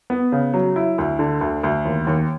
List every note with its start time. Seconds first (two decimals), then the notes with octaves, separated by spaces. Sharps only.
0.10 B3
0.32 C#3
0.54 F#3
0.76 E4
0.98 D2
1.19 D3
1.41 D2
1.63 D2
1.85 D#2
2.07 D#2